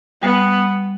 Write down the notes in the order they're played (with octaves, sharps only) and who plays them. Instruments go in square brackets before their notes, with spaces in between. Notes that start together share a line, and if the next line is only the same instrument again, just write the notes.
[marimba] G3 [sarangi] B3